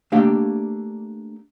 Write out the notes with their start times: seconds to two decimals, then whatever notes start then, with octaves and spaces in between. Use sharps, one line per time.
0.12 A3 A#3 D4 G4 F5